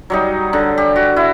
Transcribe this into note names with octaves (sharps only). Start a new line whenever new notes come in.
F#3 G3 D#4
D3
G4
F#4
E4